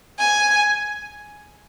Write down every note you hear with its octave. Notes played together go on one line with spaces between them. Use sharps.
G#5